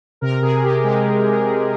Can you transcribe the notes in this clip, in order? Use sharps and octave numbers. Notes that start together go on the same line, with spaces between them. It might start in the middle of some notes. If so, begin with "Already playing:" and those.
C3 A#4
C3 G#4
C3 G4
G#3 G4
C3
G#3
C3